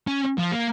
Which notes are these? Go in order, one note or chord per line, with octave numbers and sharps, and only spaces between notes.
C#4
F3
A#3